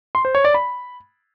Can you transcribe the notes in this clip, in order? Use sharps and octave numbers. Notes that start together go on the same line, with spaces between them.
C6
C5
C#5
D5
B5